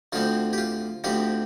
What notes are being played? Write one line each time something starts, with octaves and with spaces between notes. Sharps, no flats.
D2 D3 F3 C4 F4
G4
F4
D2 D3 F3 C4 G4